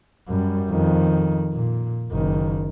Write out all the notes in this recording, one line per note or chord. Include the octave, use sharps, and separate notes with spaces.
F#2 G3
F2 D#3
A#2
F#1 D#3